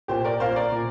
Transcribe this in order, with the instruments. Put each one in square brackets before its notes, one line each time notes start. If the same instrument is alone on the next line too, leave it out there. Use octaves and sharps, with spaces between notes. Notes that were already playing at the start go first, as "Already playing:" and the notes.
[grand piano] A#2 [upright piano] G4 C5
[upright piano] A#4 D5
[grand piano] A#3 F4 [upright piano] C5 F5
[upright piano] A#4 D5
[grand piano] A#2